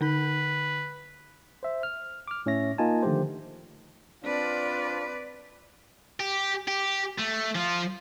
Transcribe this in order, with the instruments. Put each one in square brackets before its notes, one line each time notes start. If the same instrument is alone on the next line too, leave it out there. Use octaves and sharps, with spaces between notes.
[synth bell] D3 D#4 B5 [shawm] B4
[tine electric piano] C5 E5
F6
D6 F6
A2 C#4 C#5 E5 A#6
A#3 D#4 F4 D#5 G#5 A5
D3 D#3 F3 A3 G4 C5
[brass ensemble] C4 D4 F4 [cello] B4 D5
[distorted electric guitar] G4
G4
A3
F3 F4